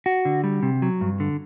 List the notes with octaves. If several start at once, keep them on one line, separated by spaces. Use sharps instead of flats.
F#4
D3
G3
C3
F#3
G2
D3